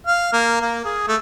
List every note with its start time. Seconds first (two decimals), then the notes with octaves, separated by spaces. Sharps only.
0.06 F5
0.33 A#3
0.61 A#3
0.85 G#4
1.07 A3